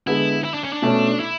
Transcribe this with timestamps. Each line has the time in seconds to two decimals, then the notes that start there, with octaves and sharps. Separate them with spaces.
0.07 D3 G#3 B3 E4
0.44 E4
0.54 D4
0.64 C#4
0.73 D4
0.82 B2 A3 C#4
1.20 E4